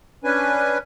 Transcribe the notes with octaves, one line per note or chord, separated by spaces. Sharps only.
C#4 D4 B4 G#5